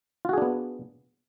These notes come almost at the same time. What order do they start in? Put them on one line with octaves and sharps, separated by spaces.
F4 F#4 G#4 D4 B3